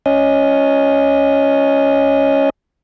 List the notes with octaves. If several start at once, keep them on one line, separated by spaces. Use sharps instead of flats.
C#4 D#5